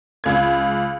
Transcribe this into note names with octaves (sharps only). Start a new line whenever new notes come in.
C#2 G#6